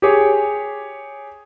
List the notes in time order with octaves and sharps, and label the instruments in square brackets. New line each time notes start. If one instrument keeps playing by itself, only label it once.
[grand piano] G4 G#4 C#5